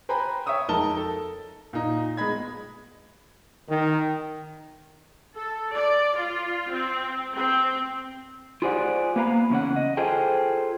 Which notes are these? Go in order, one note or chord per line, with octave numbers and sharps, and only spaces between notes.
B4 C5 G5 G#5 A#5 B5
C#5 E5 G5 C#6 D#6 E6
F2 G#3 D#4 A#4 A5 G7
A4
A#2 D#4
G#3 B3 D#5 B5 G#6
D#3
A4
D5
F4
C4
C4
F4 G4 G#4 C5 D5 F#5
A#3 B3 B4 F5 A#5
E2 C#3 C#4 F#5
D#5
F4 G#4 A4 C5 G5